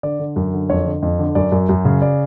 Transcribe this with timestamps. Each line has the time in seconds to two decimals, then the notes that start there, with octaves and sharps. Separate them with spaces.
0.03 D3 D5
0.19 D3
0.36 F#2
0.53 D3
0.69 F2 C#5
0.86 D3
1.02 F2
1.19 D3
1.35 F#2 D5
1.52 F#2
1.69 F#2
1.85 C#3
2.02 D5